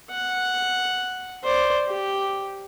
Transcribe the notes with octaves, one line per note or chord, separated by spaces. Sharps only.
F#5
C5 D5
G4